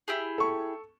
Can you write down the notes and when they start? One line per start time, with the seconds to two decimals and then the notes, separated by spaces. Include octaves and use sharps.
0.08 E4 G4 G#4
0.38 A4 C#6